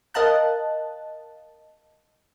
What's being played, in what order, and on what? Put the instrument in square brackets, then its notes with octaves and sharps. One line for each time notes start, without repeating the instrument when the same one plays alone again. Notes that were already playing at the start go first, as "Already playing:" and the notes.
[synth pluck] A#4 D#5 F5 A5 F#6